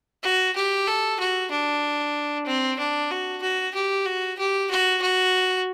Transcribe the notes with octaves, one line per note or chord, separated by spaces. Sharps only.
F#4
G4
A4
F#4
D4
C4
D4
F#4
F#4
G4
F#4
G4
F#4
F#4